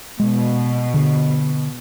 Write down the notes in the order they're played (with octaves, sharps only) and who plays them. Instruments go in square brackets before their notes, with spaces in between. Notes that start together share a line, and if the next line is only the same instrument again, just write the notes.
[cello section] B2 [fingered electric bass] G#3
[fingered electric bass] D3